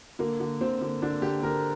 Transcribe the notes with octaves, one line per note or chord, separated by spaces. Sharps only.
D3 A#3
D3
D3 C4
D3
D3 D4
D3 G4
D3 A#4